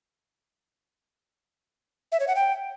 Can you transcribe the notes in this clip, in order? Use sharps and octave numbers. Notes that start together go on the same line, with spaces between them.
E5
C#5
F#5
G5